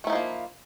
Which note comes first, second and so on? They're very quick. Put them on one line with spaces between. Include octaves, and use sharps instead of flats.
A3 E4 D#4 F3 A#3